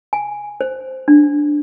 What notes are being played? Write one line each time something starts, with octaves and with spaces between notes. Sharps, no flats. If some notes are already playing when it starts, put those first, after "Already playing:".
G#5
C5
D4